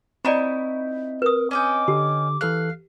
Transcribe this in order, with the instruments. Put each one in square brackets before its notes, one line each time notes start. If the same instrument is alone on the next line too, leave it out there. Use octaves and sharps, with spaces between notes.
[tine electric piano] C4 [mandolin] D#4 E4 C#6 [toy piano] D5 A#5 B5
[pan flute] A#4 [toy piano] B4 D#6
[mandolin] C#4 D#5 G5 [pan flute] D6
[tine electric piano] D3 [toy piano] G4
[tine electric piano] E3 A4 F#6 [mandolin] F5